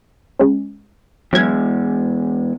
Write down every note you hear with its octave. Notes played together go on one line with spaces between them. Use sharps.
G#3 C#4
E2 F#3 G#3 G#6